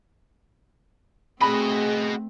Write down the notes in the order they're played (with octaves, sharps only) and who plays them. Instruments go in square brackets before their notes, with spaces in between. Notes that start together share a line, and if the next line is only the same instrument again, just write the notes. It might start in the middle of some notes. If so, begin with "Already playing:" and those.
[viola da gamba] A3 C4 [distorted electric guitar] F#4 D#5 [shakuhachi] G#4 [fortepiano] B5